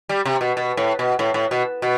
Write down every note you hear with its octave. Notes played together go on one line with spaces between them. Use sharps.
G3
C3
B2
B2
A2
B2
A2
A2
B2
B2